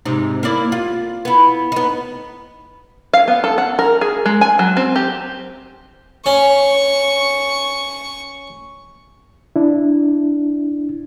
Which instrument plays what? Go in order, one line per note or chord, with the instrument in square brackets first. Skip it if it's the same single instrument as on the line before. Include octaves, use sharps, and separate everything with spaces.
[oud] G#2 C3 D#4
A#3 E4 D5
F4
B3 E4
B3 D#4
[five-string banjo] F5
B3
A4
F#5
A#4
G#4
G#3
G#5
F#3
C4
G4
[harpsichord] C#4 [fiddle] C#6
[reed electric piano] D4 E4